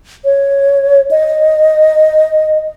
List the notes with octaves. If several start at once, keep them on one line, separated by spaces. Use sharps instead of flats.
C#5
D#5